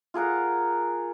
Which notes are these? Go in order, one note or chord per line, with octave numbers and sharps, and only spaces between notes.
F4 G#4 A#4 F#5